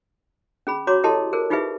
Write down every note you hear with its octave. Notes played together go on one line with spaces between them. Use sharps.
C#4 G#4 B5
F#4 C#5 A#5 C6 D6
E4 G4 A4 D#5 A5 C6
G#4 A#4 C5
D#4 F4 G4 G#4 B4 E5